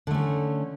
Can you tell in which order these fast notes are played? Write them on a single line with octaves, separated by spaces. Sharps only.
D3 A3 C#4